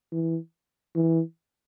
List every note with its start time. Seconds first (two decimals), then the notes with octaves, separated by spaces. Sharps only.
0.12 E3
0.96 E3